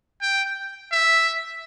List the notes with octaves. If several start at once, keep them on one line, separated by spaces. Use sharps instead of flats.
G5
E5